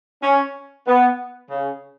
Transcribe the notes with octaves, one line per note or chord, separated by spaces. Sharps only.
C#4
B3
C#3